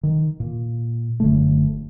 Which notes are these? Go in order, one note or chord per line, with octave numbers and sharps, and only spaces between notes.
D#3
A#2
F#1 D3 A3